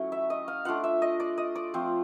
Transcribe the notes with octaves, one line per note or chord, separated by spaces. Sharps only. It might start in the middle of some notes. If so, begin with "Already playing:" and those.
Already playing: F#3 A3 C#4 E4
E5
D#5
F5
A3 D4 F4 F#5
E5
D#5
D5
D#5
D5
F3 A3 C4